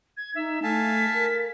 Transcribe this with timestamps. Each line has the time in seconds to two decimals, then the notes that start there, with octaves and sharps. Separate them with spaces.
0.17 G#6
0.35 D#4 E5
0.63 A3 F5 G#5 A5 B6
1.14 A#4